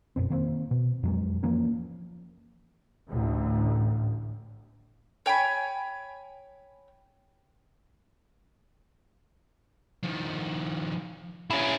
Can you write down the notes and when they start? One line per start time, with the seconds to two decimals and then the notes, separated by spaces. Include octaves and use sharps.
0.16 F1 F#2 B2 C4
0.30 D#3 A#3 C4
0.71 B2
1.03 F2 F#3 G#3
1.43 E3 F3 A#3 C#4
3.08 A1 D2 A2
5.26 C#5 G5 G#5 B5
10.03 D#3 F3
11.50 C#4 E4 G#4